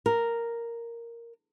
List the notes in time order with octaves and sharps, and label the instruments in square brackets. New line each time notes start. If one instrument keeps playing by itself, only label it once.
[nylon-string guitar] A#4